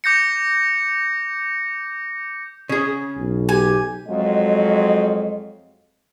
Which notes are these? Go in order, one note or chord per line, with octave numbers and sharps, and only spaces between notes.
D6 G6 A#6 C#7
C#3 G#4
B1
G4 G#5
F2 F#3 G#3 D#5